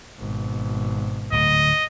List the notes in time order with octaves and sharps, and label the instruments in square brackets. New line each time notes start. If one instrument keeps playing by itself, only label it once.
[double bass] G#1 B2
[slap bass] D1 D2 D3 [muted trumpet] D#5